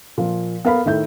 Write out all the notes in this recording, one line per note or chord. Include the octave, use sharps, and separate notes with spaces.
A#2 F3
B3 A#4 F5 B5
A2 D#3 E5 G6